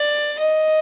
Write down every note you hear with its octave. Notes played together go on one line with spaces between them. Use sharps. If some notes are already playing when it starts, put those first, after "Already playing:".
Already playing: D5
D#5